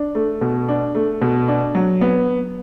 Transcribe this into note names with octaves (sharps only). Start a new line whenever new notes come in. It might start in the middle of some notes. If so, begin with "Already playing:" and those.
Already playing: D4
A3
B2
D4
A3
B2
D4
F#3
B3